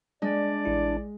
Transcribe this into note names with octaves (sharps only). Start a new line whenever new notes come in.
G#3 D4 D5
A1 E4